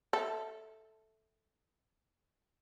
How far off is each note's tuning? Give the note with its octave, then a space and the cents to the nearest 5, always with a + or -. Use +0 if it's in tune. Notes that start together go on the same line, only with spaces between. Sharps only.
A4 +0 E5 -15